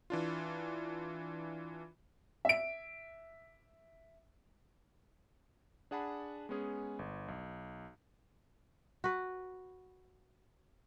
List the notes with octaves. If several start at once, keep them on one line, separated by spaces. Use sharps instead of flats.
E3 D4 F4
E5 D7
D4 G#4 F#5 A5 B5
G#3 B3 C#4 G#4
G1
B1
F#4 B4